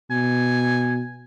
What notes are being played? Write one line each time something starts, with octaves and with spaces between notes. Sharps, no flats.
B2 G#5